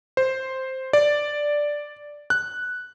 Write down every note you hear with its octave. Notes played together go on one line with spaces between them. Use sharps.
C5
D5
F#6